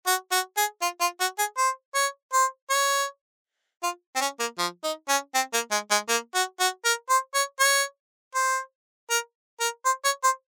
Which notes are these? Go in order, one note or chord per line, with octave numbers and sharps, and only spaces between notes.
F#4
F#4
G#4
F4
F4
F#4
G#4
C5
C#5
C5
C#5
F4
C4
C#4
A#3
F3
D#4
C#4
C4
A#3
G#3
G#3
A#3
F#4
F#4
A#4
C5
C#5
C#5
C5
A#4
A#4
C5
C#5
C5